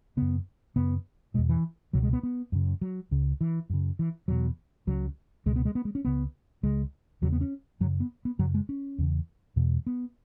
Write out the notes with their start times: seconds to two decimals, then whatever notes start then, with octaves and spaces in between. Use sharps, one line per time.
0.17 F#2 C#3 B3
0.76 F#2 C#3 B3
1.34 B2 G#3
1.38 E2
1.49 E3
1.93 C#2 B2 F#3
2.03 G#3
2.13 B3
2.23 B3
2.52 F#2 C#3
2.81 F#3
3.11 C#2 C#3
3.41 E3
3.70 F#2 C#3
3.99 E3
4.28 E2 B2 F#3
4.87 C#2 C#3 F#3
5.46 C#2 B2 G#3
5.56 B3
5.65 G#3
5.75 B3
5.85 G#3
5.95 C#4
6.05 C#2 C#3 B3
6.63 C#2 C#3 G#3
7.22 E2 C#3 F#3
7.32 B3
7.41 C#4
7.80 F#2 F#3
7.84 C#3
8.00 B3
8.25 B3
8.39 F#2 C#3 F#3
8.54 G#3
8.69 C#4
8.98 E2 C#3
9.56 E2 B2
9.86 B3